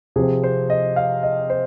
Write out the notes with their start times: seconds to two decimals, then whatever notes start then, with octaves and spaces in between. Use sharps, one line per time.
0.16 C3 F3 C4 G#4
0.43 C5
0.70 D#5
0.96 F5
1.23 D#5
1.50 C5